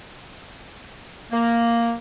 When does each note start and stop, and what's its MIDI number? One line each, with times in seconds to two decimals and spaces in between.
1.31 1.93 58